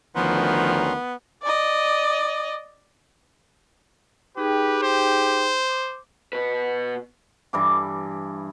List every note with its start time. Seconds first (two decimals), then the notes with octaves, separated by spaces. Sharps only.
0.16 D2 D#3 F3 B3 C#4 A#5 C6
1.43 D5 D#5
4.37 D#4 G4 G#4 B4 G5
4.83 C5
5.69 D6
6.33 B2 B4
7.53 G2 E3 D6